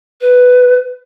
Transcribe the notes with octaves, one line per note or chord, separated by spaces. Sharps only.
B4